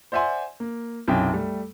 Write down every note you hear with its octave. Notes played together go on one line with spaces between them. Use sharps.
C5 D5 E5 F#5 G#5 C6
A#3
B1 F#2 C3 E4 G5 G#5
G3 A3